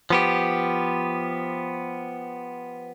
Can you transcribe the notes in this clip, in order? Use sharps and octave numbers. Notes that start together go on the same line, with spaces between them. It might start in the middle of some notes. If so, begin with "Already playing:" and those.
F3 B3 G4